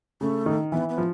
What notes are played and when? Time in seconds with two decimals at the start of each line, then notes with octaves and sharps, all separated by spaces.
0.21 C#3 A3
0.46 D#3
0.72 E3 B3
0.89 B3
0.98 F3